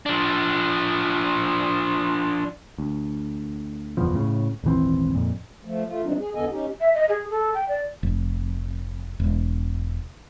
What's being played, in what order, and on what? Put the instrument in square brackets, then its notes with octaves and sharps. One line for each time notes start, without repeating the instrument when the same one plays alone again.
[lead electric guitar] F3 D4
[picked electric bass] D2
F#1 E2 B2 F3
A2 C#3
D#1 G#1 E3 C4
F2 A#2
[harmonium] F3 A3
A3 F4
E3 F3 G3 C4 D4 D#4
G#4
E2 D3 B3 A4 D#5 G#5
C#4 D#4 G4
[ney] E5
D#5
G#4
A4
G5
D5
[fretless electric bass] F1
E1